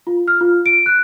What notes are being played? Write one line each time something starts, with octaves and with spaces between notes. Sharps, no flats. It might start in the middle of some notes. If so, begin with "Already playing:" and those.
F4
F6
F4
D7
F#6